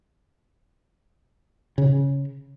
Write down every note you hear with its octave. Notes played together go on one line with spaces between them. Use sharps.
C#3